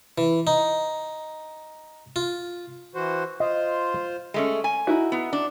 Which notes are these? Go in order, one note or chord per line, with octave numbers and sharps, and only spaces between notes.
E3
D#4
F4
E3 F#4 C5
F4 C5 D#5
G#3 A3 C#4
G#5
D#4 E4 F#4
B3
D4